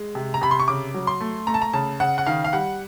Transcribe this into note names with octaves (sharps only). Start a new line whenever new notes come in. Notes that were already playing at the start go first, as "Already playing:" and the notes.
Already playing: G#3
C3
A#5
C3 B5
C6
C#6
C#3 D6
F#3
C6
A3
A3 A#5
A5
A#5
C#3 A5
C#3 F#5
F#5
D#3 F5
F5
G3 F#5